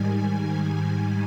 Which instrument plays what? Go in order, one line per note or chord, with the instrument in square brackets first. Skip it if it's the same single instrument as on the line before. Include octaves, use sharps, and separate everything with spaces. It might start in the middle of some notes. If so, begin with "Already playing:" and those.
Already playing: [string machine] G#2 D#3 G3 G#5